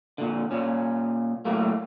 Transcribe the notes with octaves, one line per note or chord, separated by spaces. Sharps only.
A#2 D3
A#2 C#4
A2 F#3 A3 A#3